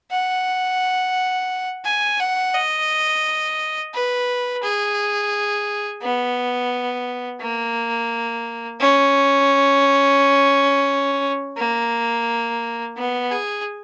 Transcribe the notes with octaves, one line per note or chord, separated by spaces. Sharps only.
F#5
G#5
F#5
D#5
B4
G#4
B3
A#3
C#4
A#3
B3
G#4